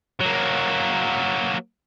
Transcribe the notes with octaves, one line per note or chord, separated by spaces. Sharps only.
F#3 A#3